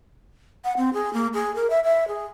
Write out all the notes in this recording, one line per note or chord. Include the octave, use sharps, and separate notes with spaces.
F#5
C4
G#4
A#3
G#4
A#4
E5
E5
G#4